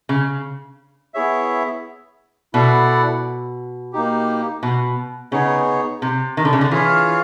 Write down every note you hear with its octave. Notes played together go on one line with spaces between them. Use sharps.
C#3
B3 E4 G#4 C#5 E5
B2 E4 A4 D5 F#5
A#3 D#4 G4
B2
C#3 B3 D#4 G#4 C#5
C3
D#3
D3
C#3
D3
E3 F4 G#4 C#5 F5